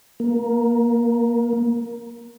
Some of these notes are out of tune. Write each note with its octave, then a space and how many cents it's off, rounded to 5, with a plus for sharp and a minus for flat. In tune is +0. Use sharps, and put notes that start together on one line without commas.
A#3 +15